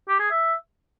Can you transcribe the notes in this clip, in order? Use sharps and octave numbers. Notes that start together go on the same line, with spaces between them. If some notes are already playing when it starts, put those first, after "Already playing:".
G4
G#4
E5